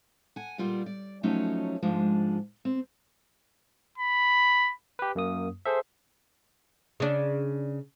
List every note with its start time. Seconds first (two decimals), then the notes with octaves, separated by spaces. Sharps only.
0.36 F#5 G#5
0.58 A#2 G3 F4 D5 F#5
0.86 D5
1.23 F3 F#3 A3 C#4 D#4
1.83 G#2 F3 G#3 D4
2.65 C4
3.98 B5
4.99 G4 B4
5.15 F#2 A#3 D#6
5.65 G#4 A4 C5 E5
7.00 C#3 D4